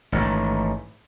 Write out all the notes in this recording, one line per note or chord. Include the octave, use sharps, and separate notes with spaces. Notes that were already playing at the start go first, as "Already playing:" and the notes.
A1 G#2 D#3